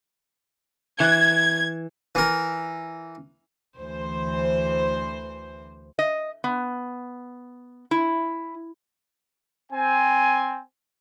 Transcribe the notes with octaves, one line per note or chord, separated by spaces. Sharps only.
E3 G#6
E3 A#4
D2 E3 C5
D#5
B3
E4
C4 G#5